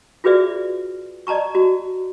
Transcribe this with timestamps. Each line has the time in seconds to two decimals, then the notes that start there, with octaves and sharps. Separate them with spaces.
0.24 F4 F#4 G#4 B4 D5 E5
1.27 D5 D#5 A5 A#5 C#6
1.55 F#4